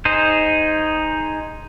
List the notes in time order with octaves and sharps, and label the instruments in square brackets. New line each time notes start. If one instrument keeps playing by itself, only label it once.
[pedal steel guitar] D#4 G#4 C5